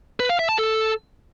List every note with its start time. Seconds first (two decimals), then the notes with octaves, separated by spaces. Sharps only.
0.20 B4
0.29 F5
0.39 E5
0.49 A5
0.58 A4